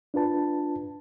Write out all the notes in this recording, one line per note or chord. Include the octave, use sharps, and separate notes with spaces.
D4 F4 B4 A5